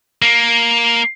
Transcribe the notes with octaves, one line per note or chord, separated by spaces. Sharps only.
A#3